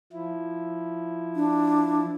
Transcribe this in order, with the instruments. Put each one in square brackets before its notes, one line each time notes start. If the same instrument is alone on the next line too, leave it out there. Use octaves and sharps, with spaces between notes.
[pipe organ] F3 E4
[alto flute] D4